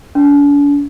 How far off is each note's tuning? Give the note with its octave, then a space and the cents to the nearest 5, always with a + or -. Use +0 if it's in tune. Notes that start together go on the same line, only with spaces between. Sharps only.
D4 -45